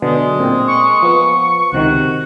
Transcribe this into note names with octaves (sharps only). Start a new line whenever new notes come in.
B2 D3 F#3 G#3
A#2 C4
C#6
F3 B3
C#2 C3 D#3 F#4